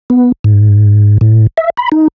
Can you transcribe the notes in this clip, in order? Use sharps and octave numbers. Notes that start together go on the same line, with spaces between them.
B3
G#2
A2
E5
B5
D#4